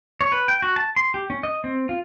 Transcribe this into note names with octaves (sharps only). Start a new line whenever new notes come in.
C#5
B4
G5
F#4
A5
C6
G4
C#4
D#5
C4
F4